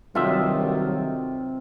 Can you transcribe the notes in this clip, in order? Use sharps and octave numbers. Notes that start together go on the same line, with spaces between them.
G2 C3 D#3 F#3 D#4 F4 A4 E5